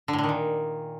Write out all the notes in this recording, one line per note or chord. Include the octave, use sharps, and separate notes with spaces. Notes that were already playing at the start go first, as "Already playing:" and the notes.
D3
A2
D3
D#3
A#2